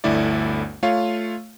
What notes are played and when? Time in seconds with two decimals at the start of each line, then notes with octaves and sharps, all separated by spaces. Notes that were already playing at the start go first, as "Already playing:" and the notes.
0.04 G1 D2 A3 E4 D5
0.83 A3 F4 C#5 F5